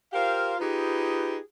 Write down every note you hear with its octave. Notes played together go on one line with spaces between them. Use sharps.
F4 G4 A#4 C5 F5
D#4 F4 G4 G#4 B4